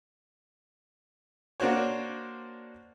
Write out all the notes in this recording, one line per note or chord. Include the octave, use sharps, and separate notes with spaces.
A#3 D4 F#4 C5 C#5